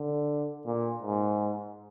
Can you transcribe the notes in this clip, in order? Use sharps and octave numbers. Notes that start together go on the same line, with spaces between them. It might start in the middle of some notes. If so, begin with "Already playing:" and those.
Already playing: D3
A#2
G#2